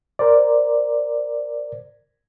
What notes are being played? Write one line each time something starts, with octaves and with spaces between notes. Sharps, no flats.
A#4 C5 D5